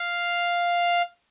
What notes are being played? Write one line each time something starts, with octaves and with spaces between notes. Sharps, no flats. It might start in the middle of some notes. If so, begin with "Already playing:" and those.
Already playing: F5